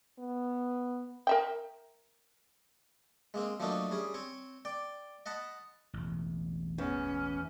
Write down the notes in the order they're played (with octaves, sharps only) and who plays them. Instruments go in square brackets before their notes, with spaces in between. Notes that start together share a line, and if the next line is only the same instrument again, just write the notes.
[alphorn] B3
[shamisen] A#4 E5 G5
[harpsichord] G#3 A#3 C4
F3 F#3 A3 A#3 D4 D#4
G3 C#4 G#4
C4 C#5
D5 G5
D#5 F#5 A5 B5
[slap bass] E1 A1
[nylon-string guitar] E2 [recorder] C#4